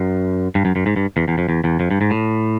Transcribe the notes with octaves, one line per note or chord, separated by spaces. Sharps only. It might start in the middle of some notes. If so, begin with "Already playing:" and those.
Already playing: F#2
G2
F#2
F#2
G#2
G2
E2
E2
F2
E2
E2
F2
G2
G#2
A2